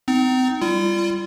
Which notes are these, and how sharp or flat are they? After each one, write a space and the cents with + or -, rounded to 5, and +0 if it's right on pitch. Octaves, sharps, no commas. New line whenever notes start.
C4 -40 D#4 +0
G3 +0 F4 -35